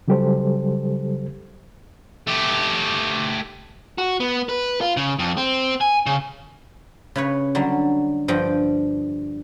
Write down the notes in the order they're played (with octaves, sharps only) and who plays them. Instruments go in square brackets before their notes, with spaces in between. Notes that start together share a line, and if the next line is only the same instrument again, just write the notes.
[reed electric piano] C#3 F#3 G3 G4 A4 C5
[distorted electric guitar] A3 G4
[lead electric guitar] F#4
B3
B4
F4
C#3
F2
C4
G#5
C#3
[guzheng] C#3 B4 C#5
D3 F#3 G3
G2 F3 G5